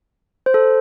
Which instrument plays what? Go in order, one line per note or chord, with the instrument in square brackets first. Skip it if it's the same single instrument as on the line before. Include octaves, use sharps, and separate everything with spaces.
[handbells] C5
A4